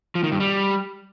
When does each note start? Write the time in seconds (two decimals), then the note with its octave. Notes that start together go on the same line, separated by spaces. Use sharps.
0.15 F3
0.24 D#3
0.32 G2
0.40 G3